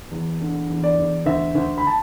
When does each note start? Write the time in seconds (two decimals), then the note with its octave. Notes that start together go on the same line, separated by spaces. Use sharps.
0.11 E2
0.41 D3
0.70 E2
0.84 D5
0.98 E2
1.26 D2 E5
1.55 D2
1.78 B5
1.87 A5